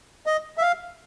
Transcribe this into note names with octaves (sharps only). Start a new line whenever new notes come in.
D#5
E5
F5